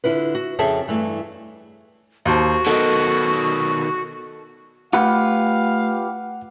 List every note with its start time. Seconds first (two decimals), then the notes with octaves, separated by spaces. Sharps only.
0.04 D3 E4 F4 B4
0.35 F#4
0.59 F2 C#3 G#4 A4 E5 A5
0.88 G2 E3 A3
2.26 D#2 F#4 C5 A5
2.67 B2 D#3 A4 D#5
4.93 A3 F4 G4 B4 F5 F#5